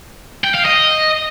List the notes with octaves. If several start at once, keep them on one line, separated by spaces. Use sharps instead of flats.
G5
F5
D#5